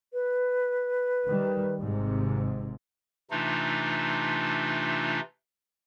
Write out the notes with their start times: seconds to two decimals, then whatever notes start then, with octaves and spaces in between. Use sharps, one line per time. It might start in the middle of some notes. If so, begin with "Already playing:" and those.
0.13 B4
1.27 D#3 G3
1.79 G#1 G#2 C3
3.31 C3 E3 A3 D4 D#4 F4